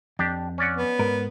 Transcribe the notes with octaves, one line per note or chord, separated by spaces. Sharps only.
F2 D4 G4
C#4 D5 F#5
B3
G#2 A#4 B4